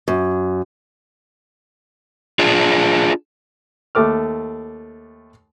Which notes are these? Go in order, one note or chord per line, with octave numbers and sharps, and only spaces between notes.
F#2
D4 F4 G#4
D#2 A3 D6 F6